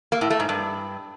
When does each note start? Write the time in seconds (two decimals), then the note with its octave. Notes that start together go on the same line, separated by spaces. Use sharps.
0.12 A#3
0.21 A2
0.30 A3
0.40 G#2
0.49 G2